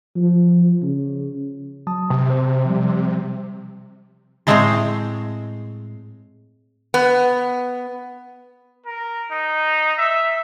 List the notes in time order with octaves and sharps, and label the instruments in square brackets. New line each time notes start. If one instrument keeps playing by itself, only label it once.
[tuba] F3
C#3
[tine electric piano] F#3 A5 D#6
[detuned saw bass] C3
[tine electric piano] C5
F3 G3
[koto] A2 G#3 C4 C5 C#5 D#5
[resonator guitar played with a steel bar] B3
[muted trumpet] A#4
D#4
E5